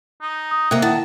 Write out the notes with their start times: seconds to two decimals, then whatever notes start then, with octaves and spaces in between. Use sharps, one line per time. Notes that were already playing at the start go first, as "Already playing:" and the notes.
0.22 D#4
0.51 D#6
0.71 C3 A#3 D#5 F#6
0.82 D#3 E4 F#5 A5